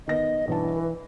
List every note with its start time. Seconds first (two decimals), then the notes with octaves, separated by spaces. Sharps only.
0.08 D#3 B3 D#5 A#6
0.47 B1 G2 E3 A5
0.77 B4